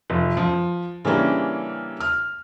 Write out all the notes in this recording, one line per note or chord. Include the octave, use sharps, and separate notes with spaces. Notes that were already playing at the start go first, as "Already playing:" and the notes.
F1
F3
C#3 E3 G3 A#3 C#4 D4
F6